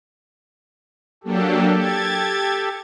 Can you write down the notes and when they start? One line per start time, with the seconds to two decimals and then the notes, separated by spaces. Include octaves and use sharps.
1.24 F#3 A#3 D4 G4 A4
1.77 G#6 A6